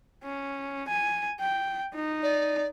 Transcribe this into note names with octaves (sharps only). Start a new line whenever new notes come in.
C#4
G#5
G5
D#4
D5